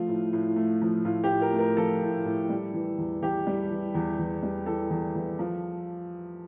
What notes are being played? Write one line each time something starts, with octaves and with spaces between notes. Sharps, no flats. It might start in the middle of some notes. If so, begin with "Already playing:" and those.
Already playing: F3 A3 F4
A2
A2
A3
F3
A2 F4
G4
A2
A#4
A3
A#4
F3 A4
A2
A2
G3
E3
E2
E2 G4
G3
E3
E2
E2
G3
E3 A4
E2
E2
F3